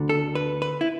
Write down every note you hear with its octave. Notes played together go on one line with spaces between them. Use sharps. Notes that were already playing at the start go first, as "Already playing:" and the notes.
Already playing: D2 D3
A4
B4
B4
E4